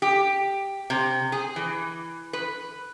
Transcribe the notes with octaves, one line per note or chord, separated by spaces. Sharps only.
G4
C3
G#4
E3
B4